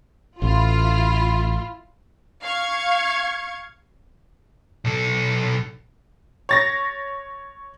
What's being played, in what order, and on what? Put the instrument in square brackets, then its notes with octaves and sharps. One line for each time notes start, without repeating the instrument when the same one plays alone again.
[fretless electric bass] A1 [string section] E4 F4
[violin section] F5 C#6 G#6
[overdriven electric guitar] B1 A4
[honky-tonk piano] C#5 A6 A#6